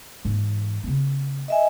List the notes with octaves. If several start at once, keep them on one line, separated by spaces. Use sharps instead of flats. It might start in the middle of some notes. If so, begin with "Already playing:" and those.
G#2 E3
C#3 B3
D#5 E5 G#5